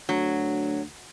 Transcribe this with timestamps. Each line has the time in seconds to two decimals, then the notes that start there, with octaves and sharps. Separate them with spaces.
0.09 D2 F#3